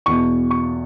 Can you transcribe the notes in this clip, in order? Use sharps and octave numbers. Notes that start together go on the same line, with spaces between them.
E2 B2 C#6
C#6